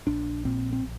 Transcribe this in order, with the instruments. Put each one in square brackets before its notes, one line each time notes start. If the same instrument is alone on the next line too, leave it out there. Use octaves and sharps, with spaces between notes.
[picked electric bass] A#1 D4
A#2 C4
C4